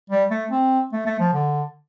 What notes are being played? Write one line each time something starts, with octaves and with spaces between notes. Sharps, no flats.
G3
A3
C4
A3
A3
F3
D3